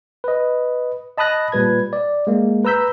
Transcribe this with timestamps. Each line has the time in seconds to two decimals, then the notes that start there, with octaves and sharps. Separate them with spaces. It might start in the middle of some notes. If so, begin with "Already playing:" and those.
0.24 B4 D#5
1.17 D#5 A5 B5 D#6 F#6 A#6
1.52 A#2 G3 B4 G#6
1.93 D5
2.27 G#3 A#3
2.65 B4 A#5 E6 G6 B6